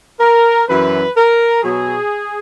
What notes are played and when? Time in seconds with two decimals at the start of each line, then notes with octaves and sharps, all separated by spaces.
0.20 A#4
0.68 F#2 E3 B4
1.16 A#4
1.62 B2 F#3 G#4